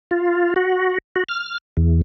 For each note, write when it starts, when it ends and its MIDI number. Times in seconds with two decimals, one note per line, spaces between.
0.11 0.54 65
0.56 0.98 66
1.16 1.23 66
1.29 1.58 89
1.77 2.02 40